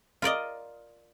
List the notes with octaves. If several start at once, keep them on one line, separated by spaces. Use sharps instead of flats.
F4 A#4 D5 D#5